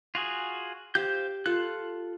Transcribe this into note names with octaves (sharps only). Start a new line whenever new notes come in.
F4 F#4 G#4
G4 C5 F5 G6
F4 A4 F#6